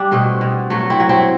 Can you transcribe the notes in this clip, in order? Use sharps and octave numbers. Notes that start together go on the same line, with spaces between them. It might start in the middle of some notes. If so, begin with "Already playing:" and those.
Already playing: G3 D4 G4
B2 A3 C4
B2
F#3 A3
C4 E4
F#3
C4 E4